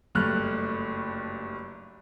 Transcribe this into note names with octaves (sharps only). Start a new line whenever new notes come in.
F#1 G2 A3 F6 F#6